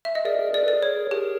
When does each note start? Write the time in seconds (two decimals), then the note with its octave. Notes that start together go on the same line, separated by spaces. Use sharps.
0.05 E5
0.15 D#5
0.25 G#4 A#4 D5
0.39 G#4 A#4
0.54 G#4 A#4 D5
0.63 A4 B4
0.68 D5
0.73 G#4 A#4
0.83 C#5
1.11 G4 G#4 A#4